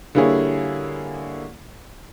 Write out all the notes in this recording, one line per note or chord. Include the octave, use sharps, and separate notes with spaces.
D3 G3 A#3 E4 G#4 C#5